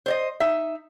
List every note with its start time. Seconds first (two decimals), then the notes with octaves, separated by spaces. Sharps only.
0.06 C5 D5 D#5
0.40 D#4 E5